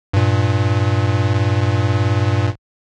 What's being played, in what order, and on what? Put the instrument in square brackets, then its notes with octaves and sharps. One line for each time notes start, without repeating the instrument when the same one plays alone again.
[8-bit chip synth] G2 A#2